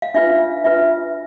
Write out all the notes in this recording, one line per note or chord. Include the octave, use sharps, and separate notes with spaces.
F5
D4 F4 B4 E5
D4 F4 B4 E5